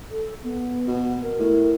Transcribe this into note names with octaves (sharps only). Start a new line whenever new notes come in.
A4
B3
B2
A#4
A2